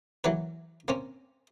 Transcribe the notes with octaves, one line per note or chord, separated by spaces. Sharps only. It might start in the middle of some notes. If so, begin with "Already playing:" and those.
E3 F#3 A#3 B4
A#3 C4 C#4